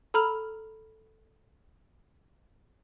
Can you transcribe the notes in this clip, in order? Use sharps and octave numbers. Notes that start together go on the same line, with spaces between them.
A4 A#5 B5 F6